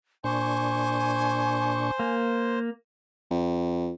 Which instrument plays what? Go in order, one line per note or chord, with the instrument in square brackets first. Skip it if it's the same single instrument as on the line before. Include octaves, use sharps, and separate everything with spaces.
[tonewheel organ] A#2 D4 C#6 [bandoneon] C5 [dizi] G#5
[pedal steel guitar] A#3
[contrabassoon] F2